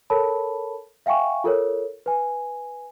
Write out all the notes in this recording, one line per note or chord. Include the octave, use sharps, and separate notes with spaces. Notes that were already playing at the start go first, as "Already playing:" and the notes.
A4 A#4 C#5 A5 B5
E5 F5 G5 G#5 C#6
F4 A4 A#4 C#5
B4 G#5